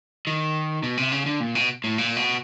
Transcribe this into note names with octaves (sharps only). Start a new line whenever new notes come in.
D#3
B2
C3
C#3
D3
A#2
B2
A2
A#2
B2